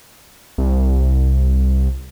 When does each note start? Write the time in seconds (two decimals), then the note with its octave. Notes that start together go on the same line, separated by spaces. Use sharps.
0.58 C2